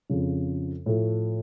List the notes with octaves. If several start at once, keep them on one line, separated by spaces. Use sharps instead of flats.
F2 C#3 F3
A2 F3 A3